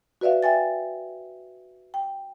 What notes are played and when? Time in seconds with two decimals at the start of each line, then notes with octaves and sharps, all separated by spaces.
0.21 F#4 B4 D5 E5 F5
0.43 E5 G5 G#5 A6
1.94 G5